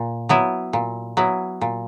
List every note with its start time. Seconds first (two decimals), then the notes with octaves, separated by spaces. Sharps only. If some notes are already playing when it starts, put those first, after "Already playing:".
Already playing: A#2
0.29 F#3 B3 E4
0.73 A#2
1.17 F#3 B3 E4
1.61 A#2